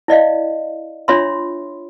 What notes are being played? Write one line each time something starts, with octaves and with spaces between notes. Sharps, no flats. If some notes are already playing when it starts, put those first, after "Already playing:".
E4 D5 D#5 F5
D4 F4 C#5 E5 B5 C6